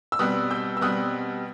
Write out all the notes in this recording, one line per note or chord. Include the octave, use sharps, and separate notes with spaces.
E6
B2 G3 C4 D#6 F#6
E6 G6
E6
B2 G3 C4 D#6 F#6